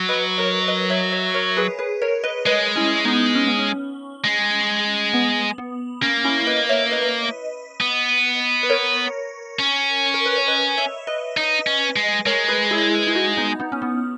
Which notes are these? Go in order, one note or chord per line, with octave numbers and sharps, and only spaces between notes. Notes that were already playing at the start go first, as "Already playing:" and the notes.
Already playing: F#3
B4 D#5
A#4 C#5
B4 D#5
C#5 E5
C#5 E5
A#4 C#5
G#4 B4
G#4 B4
A#4 C#5
B4 D#5
G#3 B4 D#5
C#4 E4
B3 D#4
C#4
B3
C#4
G#3
B3
B3
A#3 C#4
C#4 E4
B4 D#5
C#5 E5
B4 D#5
B3
B4
A#4 C#5
C#4
A#4
B4
C#5
B4 D#5
C#5 E5
B4 D#5
D#4
C#4
G#3
G#3 A#4 C#5
G#4 B4
E4 G#4
E4
D#4 F#4
B3 D#4
B3 D#4
C#4
B3